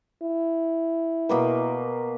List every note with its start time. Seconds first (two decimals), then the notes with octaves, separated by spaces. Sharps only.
0.23 E4
1.29 B2 A#3 B4